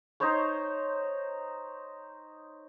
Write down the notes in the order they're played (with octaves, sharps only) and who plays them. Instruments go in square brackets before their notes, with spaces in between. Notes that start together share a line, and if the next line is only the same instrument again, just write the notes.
[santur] D#4 C5 C#5 C#6